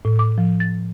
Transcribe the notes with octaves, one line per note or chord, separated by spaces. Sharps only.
A2
D6
F3
A6